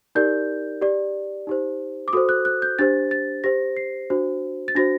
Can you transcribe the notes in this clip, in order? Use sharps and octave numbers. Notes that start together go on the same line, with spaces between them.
D#4 G4 A#4 D5 G6
G4 D5
D#4 G4 C5
D6
F#4 A4 C5 D#6
F#6
F#6
G6
D4 G4 C5 A6
A6
G4 C5 A#6
C7
D4 F#4 C5
A6
D4 F#4 C5 A#6